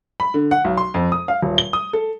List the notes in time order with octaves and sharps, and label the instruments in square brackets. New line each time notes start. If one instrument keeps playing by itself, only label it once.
[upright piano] B5
D3
F#5
B1
C6
F2
D#6
F5
D#1
G7
D#6
A4